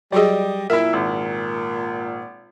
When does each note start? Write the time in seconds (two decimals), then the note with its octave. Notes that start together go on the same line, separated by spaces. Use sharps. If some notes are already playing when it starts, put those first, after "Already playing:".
0.12 F#3 G3 F#4 G#4 D5 D#5
0.70 A#2 E4 A#4 E5
0.93 G#1